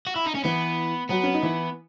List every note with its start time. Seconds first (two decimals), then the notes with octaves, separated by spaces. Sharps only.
0.07 F#4
0.16 E4
0.26 D#4
0.35 C#4
0.44 E3 B3 E4
1.10 F#3 B3 F#4
1.23 C#4
1.34 D#4
1.42 E3 E4